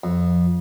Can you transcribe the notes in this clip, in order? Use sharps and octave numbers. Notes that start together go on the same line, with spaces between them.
F2